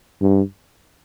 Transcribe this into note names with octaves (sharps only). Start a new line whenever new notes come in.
G2